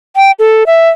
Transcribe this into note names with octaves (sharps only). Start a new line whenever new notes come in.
G5
A4
E5